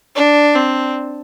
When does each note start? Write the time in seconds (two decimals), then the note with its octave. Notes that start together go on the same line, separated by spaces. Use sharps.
0.15 D4
0.55 C4